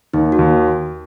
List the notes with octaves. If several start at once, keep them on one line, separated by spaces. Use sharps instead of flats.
D#2 D#4
F#4
D#2